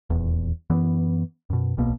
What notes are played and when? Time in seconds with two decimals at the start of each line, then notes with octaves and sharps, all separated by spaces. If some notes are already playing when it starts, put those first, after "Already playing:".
0.10 D#1 G#1 E2
0.70 F#2 E3 B3
1.50 F#2 B2
1.77 D1 B1 B2 A#3